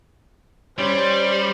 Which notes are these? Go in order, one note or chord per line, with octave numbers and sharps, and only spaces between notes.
G3 C#4 C5 D5 B5 C6